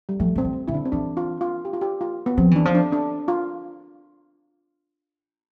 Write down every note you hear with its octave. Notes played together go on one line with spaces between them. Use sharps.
G3
F3 A3
D3 C4
E3
D3 E4
D4
C4
E3 D4
F4
F4
G4
F4
G4
F4
B3
F3 C4
E3 D4
F3
D4
D4
F4